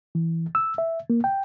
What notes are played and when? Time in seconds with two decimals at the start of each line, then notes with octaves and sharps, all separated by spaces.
0.15 E3
0.55 E6
0.78 E5
1.10 A#3
1.24 G5